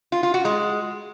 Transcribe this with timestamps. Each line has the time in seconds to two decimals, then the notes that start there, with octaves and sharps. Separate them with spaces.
0.12 F4
0.23 F4
0.34 F#4
0.45 G#3